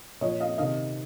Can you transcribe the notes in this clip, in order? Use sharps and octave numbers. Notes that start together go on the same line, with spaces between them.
A#2 F3 C#5 D#5
D#5 F5
C3 D#3 D#5 F5